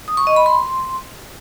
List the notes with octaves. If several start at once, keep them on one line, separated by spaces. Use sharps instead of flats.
D#6
C#6
D#5
B5
C6